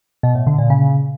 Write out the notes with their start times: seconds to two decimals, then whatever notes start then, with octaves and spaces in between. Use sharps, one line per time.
0.23 B2
0.35 A2
0.47 D3
0.58 A#2
0.70 C#3